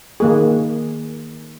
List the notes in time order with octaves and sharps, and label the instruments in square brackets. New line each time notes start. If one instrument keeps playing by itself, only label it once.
[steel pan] D#3 A#3 G#4